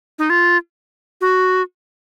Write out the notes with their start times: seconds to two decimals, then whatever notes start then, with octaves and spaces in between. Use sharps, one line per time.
0.19 D#4
0.30 F4
1.21 F#4